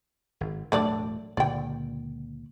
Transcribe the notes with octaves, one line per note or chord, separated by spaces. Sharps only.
G#1
E1 A2 F#3 A3 D4 D5
C#2 A#2 D3 D5 G5